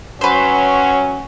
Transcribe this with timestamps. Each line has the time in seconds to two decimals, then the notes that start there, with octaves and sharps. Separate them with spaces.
0.21 F#3 C#4 B4 C5